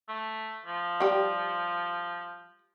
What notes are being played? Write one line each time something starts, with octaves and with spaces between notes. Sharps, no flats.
A3
F3
G3 G4